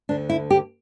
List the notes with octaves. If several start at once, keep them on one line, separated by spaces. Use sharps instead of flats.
D2 D3 D4
E4
G4